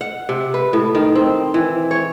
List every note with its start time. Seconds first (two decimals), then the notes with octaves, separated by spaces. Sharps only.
0.01 F#5
0.29 C3
0.54 B4
0.73 A2
0.95 D#3
1.15 C4
1.54 E3
1.91 C#5